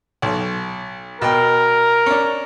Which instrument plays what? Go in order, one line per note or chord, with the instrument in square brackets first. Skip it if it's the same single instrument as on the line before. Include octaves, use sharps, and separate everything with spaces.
[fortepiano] B1
[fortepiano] B2 G5 [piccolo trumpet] A#4
[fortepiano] C#4 D4